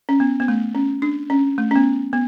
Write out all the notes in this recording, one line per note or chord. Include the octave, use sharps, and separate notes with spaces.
C#4
B3
B3
A3
C#4
D4
C#4
A3
C#4
B3
B3